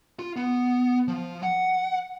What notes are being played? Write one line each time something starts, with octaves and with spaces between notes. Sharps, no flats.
F4
B3
F3
F#5